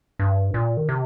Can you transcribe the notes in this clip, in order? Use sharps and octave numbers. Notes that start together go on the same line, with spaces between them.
G2
A#2
D#3
C3